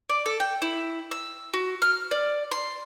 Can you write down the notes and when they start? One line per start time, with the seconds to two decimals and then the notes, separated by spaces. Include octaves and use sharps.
0.09 D5
0.26 A4
0.40 G5
0.62 E4
1.11 E6
1.54 F#4
1.82 F6
2.11 D5
2.51 C6